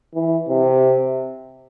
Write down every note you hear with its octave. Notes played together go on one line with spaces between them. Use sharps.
E3
C3